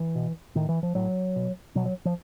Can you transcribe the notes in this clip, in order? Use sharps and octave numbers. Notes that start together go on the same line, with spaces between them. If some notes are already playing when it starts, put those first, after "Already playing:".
Already playing: E3
B2
A2 D#3
E3
F3
A2 F#3
B2
B2 F#3
F#3
F3